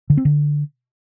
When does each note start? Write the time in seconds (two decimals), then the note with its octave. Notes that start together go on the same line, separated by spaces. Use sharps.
0.10 D3
0.17 C4
0.25 D3